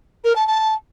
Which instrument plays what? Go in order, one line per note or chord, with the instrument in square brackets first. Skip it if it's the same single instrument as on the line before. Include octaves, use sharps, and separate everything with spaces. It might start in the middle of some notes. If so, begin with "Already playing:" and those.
[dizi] A#4
A5
A5